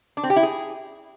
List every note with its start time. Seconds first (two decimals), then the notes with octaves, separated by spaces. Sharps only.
0.17 D4
0.23 C4
0.30 G4
0.36 E4
0.43 G#4